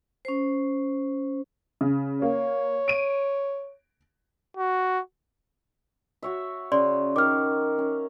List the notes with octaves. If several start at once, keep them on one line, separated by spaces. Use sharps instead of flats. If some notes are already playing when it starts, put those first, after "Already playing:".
C#4 C5
C#3
A#3 C#5
D7 D#7
F#4
F#4 C#5 E5
C#3 D5 C6
D#3 A#4 D6 F6
C#4